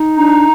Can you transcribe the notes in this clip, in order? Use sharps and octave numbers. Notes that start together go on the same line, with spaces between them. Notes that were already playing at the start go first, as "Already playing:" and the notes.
Already playing: D#4
D4 A#5